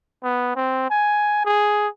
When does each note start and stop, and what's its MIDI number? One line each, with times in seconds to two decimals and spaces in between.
0.23 0.52 59
0.56 0.87 60
0.90 1.43 80
1.45 1.88 68